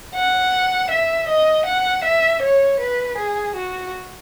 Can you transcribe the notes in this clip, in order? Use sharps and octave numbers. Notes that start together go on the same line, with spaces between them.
F#5
E5
D#5
F#5
E5
C#5
B4
G#4
F#4